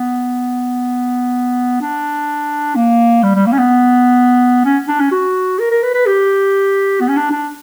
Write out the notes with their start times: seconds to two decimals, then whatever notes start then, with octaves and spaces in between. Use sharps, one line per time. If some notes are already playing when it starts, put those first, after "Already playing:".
Already playing: B3
1.81 D4
2.76 A#3
3.23 G3
3.35 G3
3.46 A#3
3.53 C#4
3.58 B3
4.65 C#4
4.88 D4
5.00 C#4
5.11 F#4
5.59 A#4
5.71 A#4
5.83 B4
5.94 B4
6.06 G4
7.01 B3
7.09 C#4
7.17 D4
7.31 D4